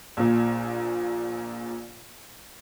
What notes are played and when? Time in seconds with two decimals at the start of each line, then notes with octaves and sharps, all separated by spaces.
0.17 A#1 A#2